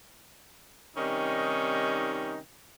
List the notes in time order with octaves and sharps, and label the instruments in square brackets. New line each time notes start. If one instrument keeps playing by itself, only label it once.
[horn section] C3 D#3 G3 C#4 D#4